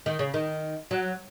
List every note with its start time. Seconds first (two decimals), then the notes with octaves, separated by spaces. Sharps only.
0.06 D#3
0.19 C#3
0.34 D#3
0.91 F#3